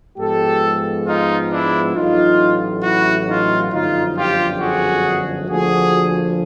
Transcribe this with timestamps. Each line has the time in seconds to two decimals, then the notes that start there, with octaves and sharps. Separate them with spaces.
0.17 G#2 F3 G#3 B3 G4 A4
1.06 D#4 F4
1.51 D4 E4
1.94 A1 A2 F#3 D#4 F4
2.83 E4 F#4
3.27 D#4 F4
3.71 G1 F#2 D3 F3 D#4 F4
4.16 F4 G4
4.60 F#4 G#4
5.48 D2 D3 F3 A#3 F#4 G#4